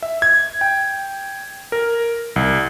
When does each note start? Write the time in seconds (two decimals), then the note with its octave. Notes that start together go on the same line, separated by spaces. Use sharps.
0.03 E5
0.22 G#6
0.61 G5
1.72 A#4
2.36 C2